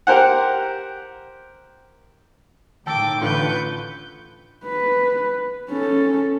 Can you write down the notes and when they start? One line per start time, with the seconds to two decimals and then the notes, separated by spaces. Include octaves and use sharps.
0.07 G4 A#4 C5 F#5
2.87 A2 D#3 G5 A5 D6 E6
3.22 A1 D3 F4 B4 C#6 G6
4.65 B4
5.70 C#4 A4